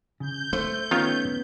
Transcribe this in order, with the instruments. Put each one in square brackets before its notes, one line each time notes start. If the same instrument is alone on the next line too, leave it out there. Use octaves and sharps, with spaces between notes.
[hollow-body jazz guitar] C#3 [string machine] G6
[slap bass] A3 [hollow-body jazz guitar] C5
[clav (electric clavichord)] D#3 F4 C#5 [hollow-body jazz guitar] B3 C#4